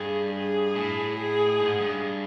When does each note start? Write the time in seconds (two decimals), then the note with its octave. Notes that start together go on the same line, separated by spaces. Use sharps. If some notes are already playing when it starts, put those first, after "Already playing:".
Already playing: G2 G#4
0.32 G#4
0.75 A2
1.17 G#4
1.60 G#2
1.81 G2